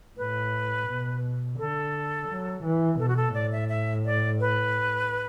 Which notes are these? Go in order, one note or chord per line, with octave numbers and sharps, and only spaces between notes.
A2 B4
B2
D3 A4
F#3
E3
B2 A4
F#4
A4
A2 D5
E5
E5
D5
B4